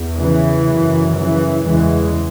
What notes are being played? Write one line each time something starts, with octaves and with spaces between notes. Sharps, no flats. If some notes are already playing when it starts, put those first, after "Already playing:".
Already playing: E2
C#3 E3
F#2 C#3
C#3 E3
E2 C#3 E3 G#3